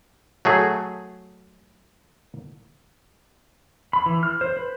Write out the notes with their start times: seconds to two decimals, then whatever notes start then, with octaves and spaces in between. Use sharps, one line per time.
0.45 F#3 A3 G#4
3.93 B5
4.06 E3
4.23 F6
4.41 C5
4.57 B4